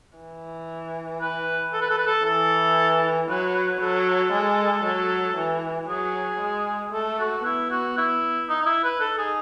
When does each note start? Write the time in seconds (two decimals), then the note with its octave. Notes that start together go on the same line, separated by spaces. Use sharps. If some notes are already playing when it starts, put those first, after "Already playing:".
0.17 E3
1.21 B4
1.73 A4
1.81 B4
1.90 A4
1.98 B4
2.07 A4
2.25 E3 A4
3.29 F#3 B4
3.55 B4
3.81 F#3 A4
4.33 G#3
4.84 F#3
5.37 E3
5.89 F#3 G#4
6.41 G#3
6.93 A3 A4
7.19 F#4
7.45 B3 E4
7.71 F#4
7.97 E4
8.49 D#4
8.62 D#4
8.66 E4
8.84 B4
9.00 D#4 A4
9.18 G#4